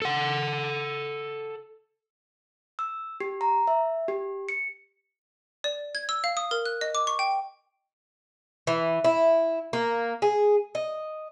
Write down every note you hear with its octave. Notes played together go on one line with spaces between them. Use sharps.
A4 F#5
E6
G4
A#5
E5
G4
C#7
D5
G#6
E6
F5
D#6
A#4
F#6
D#5
D6
C#6
G5
E3
E4
A#3
G#4
D#5